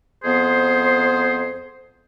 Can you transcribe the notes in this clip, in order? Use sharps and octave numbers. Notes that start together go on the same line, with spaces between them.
F2 B3 G#4 C5